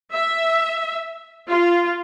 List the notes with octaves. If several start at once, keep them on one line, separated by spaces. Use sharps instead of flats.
E5
F4